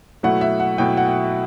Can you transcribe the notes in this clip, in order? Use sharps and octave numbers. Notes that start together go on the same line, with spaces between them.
B2 F#3 A3 E4 F#5
E5
F#5
B2 F#3 A3 E4 G5
F#5
G5